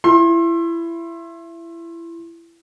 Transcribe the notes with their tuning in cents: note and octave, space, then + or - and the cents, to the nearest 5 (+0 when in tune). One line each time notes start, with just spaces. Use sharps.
E4 +25 C6 +35